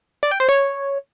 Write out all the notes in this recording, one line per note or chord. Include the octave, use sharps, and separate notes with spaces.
D5
G5
C5
C#5